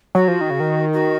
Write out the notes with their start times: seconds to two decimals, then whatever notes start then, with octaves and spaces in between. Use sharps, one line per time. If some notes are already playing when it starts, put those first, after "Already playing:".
0.15 F#3 F#4
0.28 F3
0.41 D#3
0.50 C#3
0.60 D#3
0.93 F#4